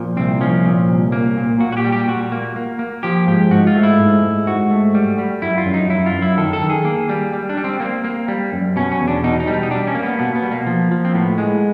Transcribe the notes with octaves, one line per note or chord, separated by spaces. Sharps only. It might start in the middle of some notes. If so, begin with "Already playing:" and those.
Already playing: A#2 F3
C2 C4
F3 C#4
A#2
C2
A#3
A#2
A#2 F#4
F#4
G4
G3
G4
A#2 F#4
A#3
A#3
A#3
F3 G4
G#2 G4
G#2 F#4
F4
A3
E4
G#2
G#2
G#2 F#4
A3
G3
G3
F#2 E4
F4
F#2
D#4
F#2 E4
F4
F#2
E4
D#3 A4
A4
D#3
G#4
A#3
G3
G3
D4
G3
C4
A#3 C4
A#3
G3
F#2
B2 C#4
C#4
E2
D4
B2 D#4
D#4
G3
D#4
G3 D4
C#4
A#3
B3
B2 B3
B3
G3
A#3
F3
F3
C4
A2 B3
G#3